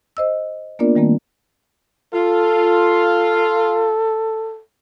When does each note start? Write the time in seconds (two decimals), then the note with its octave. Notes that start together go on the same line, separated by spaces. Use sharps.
0.17 C5 D#5 E6
0.79 A#3 B3 D4 F4 A#4 D5
0.95 D#3 G3 A3 A#3 C4
2.14 F4 A4